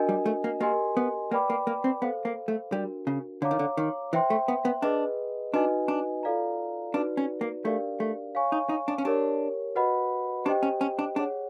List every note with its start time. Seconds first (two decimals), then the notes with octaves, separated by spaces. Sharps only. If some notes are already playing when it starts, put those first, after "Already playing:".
Already playing: D4 F#4 A#4 D#5 G#5
0.09 G3
0.26 A3
0.44 A#3
0.61 A#3 G4 A#4 D#5 G#5 C6
0.97 B3
1.31 A#3 B4 D5 G5 B5 D6
1.50 A#3
1.67 A#3
1.84 C4
2.02 B3 A4 C5 F5
2.25 A#3
2.48 A3
2.72 G3 D4 F#4 A#4
3.07 C#3
3.42 D3 C#5 F5 A#5 D6
3.51 D#3
3.59 D3
3.77 D#3
4.13 E3 C5 E5 G5 C6
4.30 A3
4.48 B3
4.65 B3
4.82 D4 G#4 B4 D#5
5.54 D4 D#4 F#4 B4 D#5 G#5
5.88 D4
6.23 F4 A4 D5 F5 A#5
6.94 D4 D#4 F#4 B4 D5
7.17 C#4
7.41 A#3
7.64 A3 D4 G4 A#4 D5 F5
8.00 A3
8.35 C#5 F5 G#5 C#6
8.52 D#4
8.69 D#4
8.88 D4
8.98 C#4
9.05 D4 G4 A#4 C#5
9.75 F#4 B4 D#5 F#5 B5
10.45 D4 G4 C5 D#5 G5
10.63 C#4
10.81 C#4
10.99 D4
11.15 D4 G#4 C#5 F#5